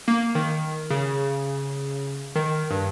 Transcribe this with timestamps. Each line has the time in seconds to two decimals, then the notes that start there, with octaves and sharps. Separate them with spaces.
0.08 A#3
0.35 D#3
0.90 C#3
2.35 D#3
2.70 G2